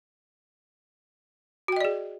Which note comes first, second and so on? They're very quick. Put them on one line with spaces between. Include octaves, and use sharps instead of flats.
F#4 G5 D#5 D5 G#4